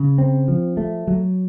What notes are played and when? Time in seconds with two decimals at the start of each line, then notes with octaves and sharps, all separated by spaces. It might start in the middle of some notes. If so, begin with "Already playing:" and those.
Already playing: C#3
0.18 C4
0.48 F3
0.77 A3
1.07 F#3